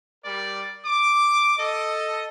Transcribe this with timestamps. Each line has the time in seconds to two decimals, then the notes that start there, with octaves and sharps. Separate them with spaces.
0.25 G3 A#4 D5
0.86 D6
1.59 A4 D#5